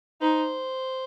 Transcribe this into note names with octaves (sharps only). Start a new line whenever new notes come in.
D#4 C5